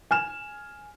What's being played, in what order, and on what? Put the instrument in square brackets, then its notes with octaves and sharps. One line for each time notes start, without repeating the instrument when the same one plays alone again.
[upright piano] G#5 F6 E7